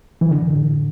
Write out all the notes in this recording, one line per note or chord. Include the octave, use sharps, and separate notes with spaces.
E3
D3